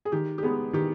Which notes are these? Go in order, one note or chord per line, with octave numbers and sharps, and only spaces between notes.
G#4
D#3 G4
G4
G#3 B3 G#4
D#3 G4